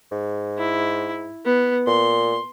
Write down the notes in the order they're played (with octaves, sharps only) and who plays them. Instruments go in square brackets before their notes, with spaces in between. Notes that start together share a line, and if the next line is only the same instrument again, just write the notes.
[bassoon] G#2
[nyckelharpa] E4
B3
[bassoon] A#2 [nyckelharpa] C6